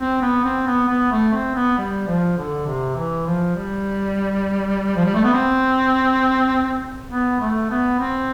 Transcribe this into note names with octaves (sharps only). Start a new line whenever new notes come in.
C4
B3
C4
B3
B3
A3
C4
B3
G3
F3
D3
C3
E3
F3
G3
F3
G3
A3
B3
C4
B3
A3
B3
C4